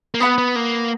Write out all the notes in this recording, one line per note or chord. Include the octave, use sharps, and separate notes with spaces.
A#3
B3 B4 F#5 B5 D#6
B3
A#3